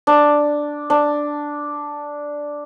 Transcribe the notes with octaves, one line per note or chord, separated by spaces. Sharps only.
D4
D4